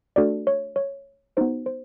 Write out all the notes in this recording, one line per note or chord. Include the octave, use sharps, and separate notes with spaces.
A3 D4 F#4 A4 D5
C#5
C#5
B3 D#4 F#4 C5
C5